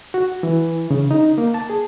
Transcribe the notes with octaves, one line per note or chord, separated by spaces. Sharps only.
F#4
E3
C#3
D#4
A#3
A5
G#4